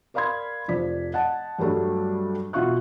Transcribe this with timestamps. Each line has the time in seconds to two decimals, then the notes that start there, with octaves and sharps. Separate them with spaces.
0.14 A#4 D5 F5 B5 C6 G#6
0.68 F1 F3 D5 B6
1.13 D#5 F#5 A5
1.59 G2 F#3 G3 A3 D4
2.53 B2 F4 E5 C#6 F#6